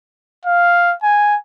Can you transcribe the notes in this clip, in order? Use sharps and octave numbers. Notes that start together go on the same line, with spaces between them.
F5
G#5